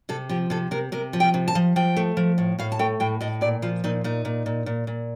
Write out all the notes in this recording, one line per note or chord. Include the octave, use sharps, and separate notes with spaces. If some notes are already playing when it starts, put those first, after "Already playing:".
C3 A4
F3 G4
C3 A4
C3 A#4
C3 A#4
F3
G5
C3
A5
F3
F3 G5
A3
F3
A2
A2 F5
A5
A3 G5
A2 G5
A2 D#5
A#2 D5
F3 F4
A#2 D#4
A#2 D#4
A#2
A#2
A#2
A#2